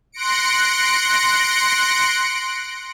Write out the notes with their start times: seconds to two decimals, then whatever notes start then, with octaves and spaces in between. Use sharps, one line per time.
0.12 C6 F#6 A#6 C#7 D7